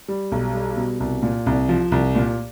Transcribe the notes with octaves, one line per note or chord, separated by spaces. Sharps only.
G3
B1
G3
B2
C2
A#2
C2
F3
C2
A#2